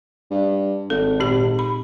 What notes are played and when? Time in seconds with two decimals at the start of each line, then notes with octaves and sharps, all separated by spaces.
0.31 G2
0.90 G#1 A4
1.20 A#2 C4 G4
1.59 B5